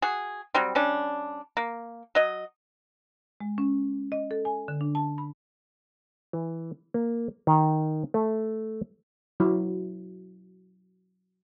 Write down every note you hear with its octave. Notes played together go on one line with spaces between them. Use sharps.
F#4 G#4
F#3 G3 C4
G3 C#4 D4
A#3
F#3 D#5
G#3
C#4
D#5
A4
G#5
D3
D4
A5
B5
E3
A#3
D#3
A3
F#3 E4